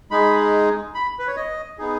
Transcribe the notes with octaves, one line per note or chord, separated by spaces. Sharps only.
G#3 D#4 G#4 B5
B5
B4
C#5
D#5
B3 D#4 G#4